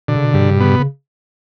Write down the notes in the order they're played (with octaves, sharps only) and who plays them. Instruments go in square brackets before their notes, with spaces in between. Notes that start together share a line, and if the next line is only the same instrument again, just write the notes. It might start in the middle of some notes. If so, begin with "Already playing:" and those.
[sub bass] B2 [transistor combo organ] D3
[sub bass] C#3
B2
[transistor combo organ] G2 [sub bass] C#3
[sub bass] B2
C#3
B2
[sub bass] C#3 [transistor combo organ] B3
[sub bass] B2
C#3